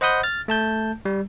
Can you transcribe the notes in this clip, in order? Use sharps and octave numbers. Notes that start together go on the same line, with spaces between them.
C5 D#5 F#5 B5 D#6 G6
F6 A6
A3 A5 G6
G3